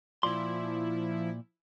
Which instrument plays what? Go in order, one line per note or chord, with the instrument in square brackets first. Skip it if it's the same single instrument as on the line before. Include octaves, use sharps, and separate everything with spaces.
[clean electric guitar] A#2 D5 C6 [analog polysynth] F3 E4